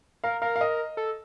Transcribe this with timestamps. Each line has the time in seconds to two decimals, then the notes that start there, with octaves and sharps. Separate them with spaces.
0.24 A#4 F5
0.42 A#4 F5
0.56 F5
0.61 D#5
0.97 A4